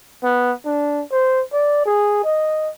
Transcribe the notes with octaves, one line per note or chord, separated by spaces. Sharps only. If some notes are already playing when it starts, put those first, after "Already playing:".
B3
D4
C5
D5
G#4
D#5